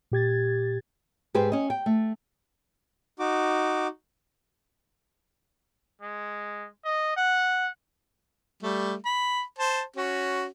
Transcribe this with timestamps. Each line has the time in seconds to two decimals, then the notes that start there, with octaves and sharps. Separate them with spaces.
0.12 A#2 G4 G#6 A6
1.34 G#2 G4 G#4 B4 C5
1.52 C#4 D#5
1.70 G5
1.86 A3
3.19 D#4 F#4 D6
6.02 G#3
6.85 D#5
7.16 F#5
8.63 G3 A3
9.05 B5
9.58 C5 A5
9.96 C#4 F#4